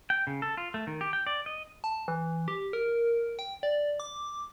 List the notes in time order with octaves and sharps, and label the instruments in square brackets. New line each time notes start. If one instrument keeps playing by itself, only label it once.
[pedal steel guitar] G5
C#3
A4
F4
A3
D#3
G4
G5
D5
D#5
[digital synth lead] A5
E3
G4
A#4
G5
D5
D6